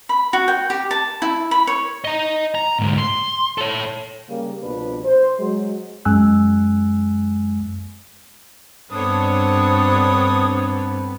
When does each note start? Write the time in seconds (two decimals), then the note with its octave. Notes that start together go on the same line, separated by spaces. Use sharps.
0.09 B5
0.33 F#4
0.48 G5
0.70 G4
0.91 A5
1.22 E4
1.51 B5
1.67 C#5
2.04 D#5 A#5
2.55 A#5
2.79 D2 G#2
2.98 C6
3.58 A4 C#5
4.29 C#3 G3 A#3
4.63 C2 B2 F3 D4 B4
5.04 C5
5.39 F#3 G#3
6.05 F#2 G#3 G#5 E6 F#6
8.92 G2 B3 C4 D4 A4 C#5 D#6